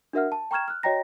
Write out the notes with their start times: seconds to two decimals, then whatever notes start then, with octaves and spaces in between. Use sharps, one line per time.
0.13 D4 F#4 A#4 E5 F#5 F6
0.32 A5
0.51 G5 A#5 C#6 F6 G#6 E7
0.68 F6 F#6
0.83 F#4 C#5 D#5 G5 A#5 A#6